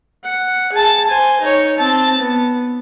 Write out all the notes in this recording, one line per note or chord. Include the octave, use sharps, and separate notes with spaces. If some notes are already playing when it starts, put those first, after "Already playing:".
F#5
G#4 A5
C5 G#5
D#4 C#5
C4 A5
B3